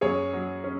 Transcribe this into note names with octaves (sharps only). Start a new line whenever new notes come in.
F#2 G#4 C#5
F#3
C#4